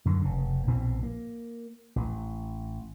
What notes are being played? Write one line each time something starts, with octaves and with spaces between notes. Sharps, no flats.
F#2 D3 D#3
F1 C#3
A#1 B2 E3 C4
A#3
A1